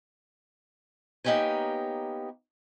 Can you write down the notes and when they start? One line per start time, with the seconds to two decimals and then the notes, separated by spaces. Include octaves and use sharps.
1.24 A#3 B3 D#4 G4 C#5 G#5